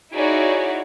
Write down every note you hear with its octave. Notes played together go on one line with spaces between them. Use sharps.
D#4 E4 F#4 G#4 C#5 D5